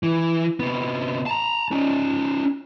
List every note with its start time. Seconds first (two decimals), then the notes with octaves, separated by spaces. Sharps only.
0.03 E3
0.60 C3 B3
1.26 A5 A#5
1.71 C#4 D#4